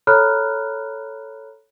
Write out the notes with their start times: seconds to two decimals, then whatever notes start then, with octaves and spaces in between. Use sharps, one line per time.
0.07 A4 C#5 A#5 B5 F6 F#6